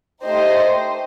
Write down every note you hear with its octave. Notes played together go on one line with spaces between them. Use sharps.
A3 D#4 G4 C5 D#5